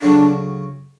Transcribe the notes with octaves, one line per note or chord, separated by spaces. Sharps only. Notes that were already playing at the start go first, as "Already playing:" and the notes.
D2 C#3 F#3 D4